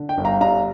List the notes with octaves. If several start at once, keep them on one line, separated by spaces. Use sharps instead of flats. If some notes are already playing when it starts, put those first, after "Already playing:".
Already playing: D3
G5
G1
F5 A#5
G2 F5 A#5